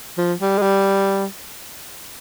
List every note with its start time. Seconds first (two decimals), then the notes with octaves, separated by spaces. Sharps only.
0.18 F3
0.41 G3
0.58 G#3
0.62 G3